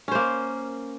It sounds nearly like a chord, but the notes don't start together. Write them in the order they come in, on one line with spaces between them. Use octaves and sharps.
C#4 C5 A#3